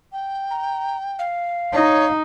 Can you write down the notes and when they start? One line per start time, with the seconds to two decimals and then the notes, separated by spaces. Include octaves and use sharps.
0.12 G5
0.51 A#5
1.19 F5
1.73 D#4 C#5